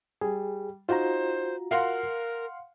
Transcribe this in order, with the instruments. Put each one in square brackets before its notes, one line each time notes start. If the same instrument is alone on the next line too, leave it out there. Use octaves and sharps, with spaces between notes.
[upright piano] G3 [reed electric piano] G#4
[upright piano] D#4 [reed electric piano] F4 F#4 A#5 [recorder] C5
[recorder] A#4 [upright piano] F5 F#5 C6